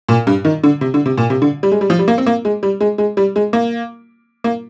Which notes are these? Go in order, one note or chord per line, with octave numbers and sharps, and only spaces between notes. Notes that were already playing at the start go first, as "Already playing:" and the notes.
A#2
G2
D#3
D3
C3
D3
C3
A#2
C3
D3
G3
G#3
G3
F3
G3
A#3
C4
A#3
G#3
G3
G#3
G#3
G3
G#3
A#3
A#3